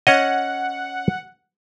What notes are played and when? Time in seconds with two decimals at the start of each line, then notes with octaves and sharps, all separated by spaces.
0.07 C#4 C#5 D#5 F#5